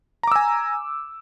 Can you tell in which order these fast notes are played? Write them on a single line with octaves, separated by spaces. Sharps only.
A#5 D6 E6 G#5